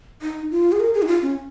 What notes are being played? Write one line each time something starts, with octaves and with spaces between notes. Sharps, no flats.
D#4
F4
G#4
A#4
G#4
D#4
F4
C#4